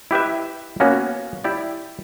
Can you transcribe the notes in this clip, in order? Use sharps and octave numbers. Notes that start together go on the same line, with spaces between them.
E4 G4 B4 E5
A#3 B3 C#4 F#4
E4 G4 D5